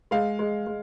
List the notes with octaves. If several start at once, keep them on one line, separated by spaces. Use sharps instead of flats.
G#3 F5
G#3
G#3